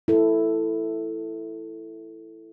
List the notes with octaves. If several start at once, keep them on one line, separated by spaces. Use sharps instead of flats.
E4 A4